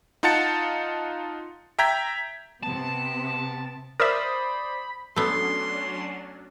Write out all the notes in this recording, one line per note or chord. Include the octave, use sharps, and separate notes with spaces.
D#4 F4 F#5 A5 A6 C#7
E5 G5 A#5 G6 G#6 B6
C3 B3 A5
A#4 C5 D5 E5 B5 D#6
F#3 A3 B3 C#4 D4 C6